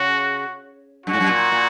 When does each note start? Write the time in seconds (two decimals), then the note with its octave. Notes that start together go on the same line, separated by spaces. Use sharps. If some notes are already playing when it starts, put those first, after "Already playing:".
Already playing: C#3 F#4
1.06 F#2 F#4
1.13 G#2
1.20 F#2
1.29 A#2
1.52 A#2